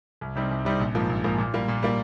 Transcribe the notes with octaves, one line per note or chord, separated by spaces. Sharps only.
C2
C3 G3 C4 D#4
C2
C3 G3 C4 D#4
A#1
G#2 F3 A#3
A#1
G#2 F3 A#3
A#2
G3 A#3 F4
A#2
G3 A#3 F4